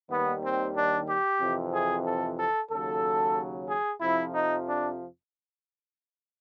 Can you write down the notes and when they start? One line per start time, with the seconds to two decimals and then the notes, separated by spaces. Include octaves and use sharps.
0.10 D#2 D#3 G3 B3
0.43 C4
0.76 D4
1.08 G4
1.40 F2 C3 E3
1.73 G#4
2.06 A4
2.38 A4
2.71 D#2 C#3 F#3 A4
3.68 G#4
4.01 F2 C3 F3 E4
4.34 D#4
4.66 D4